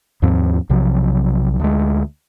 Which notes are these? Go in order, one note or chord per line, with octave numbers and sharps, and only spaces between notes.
D#2 G#2 F3 C4
B1 C3 F3 F#3
D2 G#3